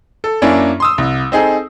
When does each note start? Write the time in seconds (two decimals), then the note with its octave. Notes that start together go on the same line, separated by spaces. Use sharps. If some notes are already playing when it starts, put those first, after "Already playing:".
0.24 A4
0.42 F#2 A#3 C#4 D4 E4
0.80 C6 D#6 E6
0.98 C2
1.32 C4 D#4 G#4 A4